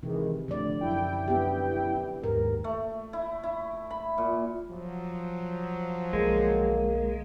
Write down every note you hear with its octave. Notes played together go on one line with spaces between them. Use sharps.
C3 D#3 E3 G#3
A2 D3 F3 D5
F#2 E4 G5
B3 G4
D#2 G#2 A#4
A3
E4
E4
B5
A#2
F3 F#3
B1 D3 G#3 A#3